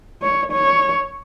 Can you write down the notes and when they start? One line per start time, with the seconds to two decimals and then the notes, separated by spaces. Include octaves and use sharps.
0.23 C#5
0.52 C#5